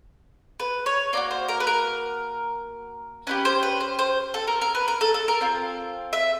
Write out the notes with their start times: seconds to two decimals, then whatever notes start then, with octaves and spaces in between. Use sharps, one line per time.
0.60 B4
0.86 C#5
1.13 A#3 D#4 F#4 D5
1.31 C5
1.48 A#4
1.60 B4
1.67 A#4
3.27 C#4 E4 G4 B4
3.45 C5
3.63 B4
3.80 C5
3.99 C5
4.34 A4
4.47 A#4
4.61 A#4
4.75 B4
4.88 A#4
5.01 A4
5.14 A4
5.28 A#4
5.41 C4 F4 A4
6.13 E5